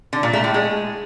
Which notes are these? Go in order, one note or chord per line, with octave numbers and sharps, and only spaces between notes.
D3
A#2
A3
A2
G#3